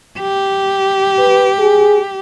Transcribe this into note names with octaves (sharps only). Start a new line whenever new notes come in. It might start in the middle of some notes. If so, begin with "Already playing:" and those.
G4
B4
G#4